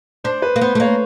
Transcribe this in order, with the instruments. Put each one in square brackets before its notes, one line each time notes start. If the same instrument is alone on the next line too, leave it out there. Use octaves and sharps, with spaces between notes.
[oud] D4 [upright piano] C5
[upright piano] B4
[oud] A#3
[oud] B3 [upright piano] C5
[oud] A3
[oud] A#3 [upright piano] C#5